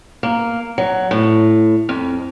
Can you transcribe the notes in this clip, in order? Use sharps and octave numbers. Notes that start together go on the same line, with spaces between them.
A#3
F#3
A2
F2